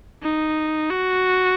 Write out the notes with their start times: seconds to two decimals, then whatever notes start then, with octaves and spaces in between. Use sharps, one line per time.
0.23 D#4
0.91 F#4